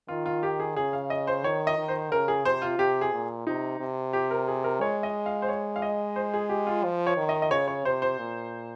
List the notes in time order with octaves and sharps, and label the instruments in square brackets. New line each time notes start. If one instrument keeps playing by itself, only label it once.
[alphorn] D#3 [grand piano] F4
[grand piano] F4
G4
G#4
[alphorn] C#3 [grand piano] G#4
[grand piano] F5
D#5
C5
[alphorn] D#3 [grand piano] C#5
[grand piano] D#5
[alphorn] D#3
[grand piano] C5
[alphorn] C#3 [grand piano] A#4
[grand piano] G#4
[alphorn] C3 [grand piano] C5
[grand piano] F4
[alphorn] C3 [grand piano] G4
[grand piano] G#4
[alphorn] A#2
[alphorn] C3 [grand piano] D#4
[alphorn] C3
[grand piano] G4
A#4
G#4
A#4
[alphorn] G#3 [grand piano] C#5
[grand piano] D#5
F5
C5
C#5
F5
D#5
C5
G#4
G4
F4
[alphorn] F3
[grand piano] C#5
[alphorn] D#3
[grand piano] D#5
D#5
[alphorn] C#3 [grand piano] C#5
[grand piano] C#5
[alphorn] C3 [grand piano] C5
[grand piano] C5
[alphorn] A#2